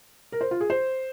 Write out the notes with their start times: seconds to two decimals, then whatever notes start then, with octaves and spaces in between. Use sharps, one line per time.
0.32 A#4
0.41 C5
0.51 F4
0.61 G#4
0.70 C5